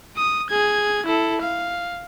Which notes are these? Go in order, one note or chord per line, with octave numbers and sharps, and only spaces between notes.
D#6
G#4 G#6
E4 A4
F5